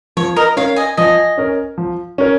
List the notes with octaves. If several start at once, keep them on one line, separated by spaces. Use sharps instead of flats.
F3 C#5
A#4 D#5
C#4 A#4 C#5 F5
D#5 G#5
F3 D#5 G#5
C#4 A#4
F3
C#4 A#4